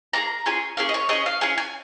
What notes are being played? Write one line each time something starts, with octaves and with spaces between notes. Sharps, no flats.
A#3 D#4 G#4 A#5
C#4 F4 G#4 G#5
A#3 C#4 G#4 F5
D#5
C#5
C#4 G#4 D#5
F5
C#4 F4 G#4 G#5
G#5